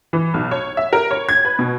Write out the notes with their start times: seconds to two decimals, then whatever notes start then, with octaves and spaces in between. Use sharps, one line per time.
0.13 E3
0.34 B1
0.51 C#5
0.77 E5
0.93 A#4
1.11 C#5
1.29 G#6
1.45 B4
1.59 B2